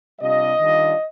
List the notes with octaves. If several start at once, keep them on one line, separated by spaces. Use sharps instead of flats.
C3 G3 D4 F4 D#5
D#3 G3 D4 F4